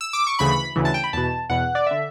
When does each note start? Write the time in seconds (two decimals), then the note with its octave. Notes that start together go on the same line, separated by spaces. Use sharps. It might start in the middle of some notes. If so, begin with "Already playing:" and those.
0.01 E6
0.13 D6
0.27 C#6
0.39 D2 C#3 E3 B5
0.76 D2 C#3 E3
0.85 A5
0.94 G5
1.04 B5
1.13 E2 B2 A5
1.50 E2 B2 F#5
1.75 D5
1.86 D3 E5